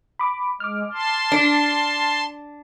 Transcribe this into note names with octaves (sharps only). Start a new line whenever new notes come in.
B5 D6
G#3 D6 F6
A5 C6
D4